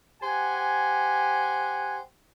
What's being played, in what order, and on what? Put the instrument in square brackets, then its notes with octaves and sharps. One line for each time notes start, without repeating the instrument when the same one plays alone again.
[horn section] G4 C5 F#5 G#5